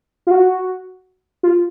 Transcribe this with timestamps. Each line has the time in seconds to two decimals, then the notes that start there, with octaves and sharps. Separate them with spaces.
0.27 F4
0.31 F#4
1.43 F4